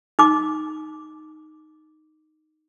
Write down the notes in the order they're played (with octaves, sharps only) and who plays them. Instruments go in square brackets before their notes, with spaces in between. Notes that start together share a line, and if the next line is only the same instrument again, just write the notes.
[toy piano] D#4 D6